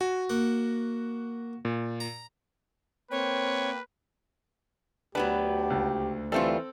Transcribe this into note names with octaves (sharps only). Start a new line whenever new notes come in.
F#4 G#5
A#3 F#5
A#2
A#5
A#3 C4 B4 C#5 G5
D2 F#3 B3 D4 G4 B4
C#2
E3 G3 A3 C4 F4 A4